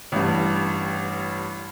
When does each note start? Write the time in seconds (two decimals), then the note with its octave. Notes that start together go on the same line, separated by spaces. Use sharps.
0.12 A1 G2